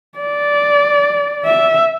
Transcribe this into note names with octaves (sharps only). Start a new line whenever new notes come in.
D5
E5